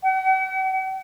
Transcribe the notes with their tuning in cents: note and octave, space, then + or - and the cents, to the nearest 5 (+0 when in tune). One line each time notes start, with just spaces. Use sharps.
F#5 +45